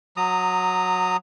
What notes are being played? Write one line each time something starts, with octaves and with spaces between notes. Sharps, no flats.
F#3 A#5 D#6